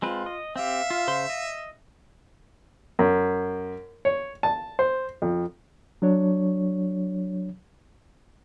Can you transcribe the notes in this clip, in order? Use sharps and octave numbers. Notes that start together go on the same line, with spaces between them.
G#3 C4 F4 B4
D#5
C4 G4 E5 F5
F4
C#3 C5 C6
D#5
F#2
C#5
A5
C5
F2
F#3 D4 C#5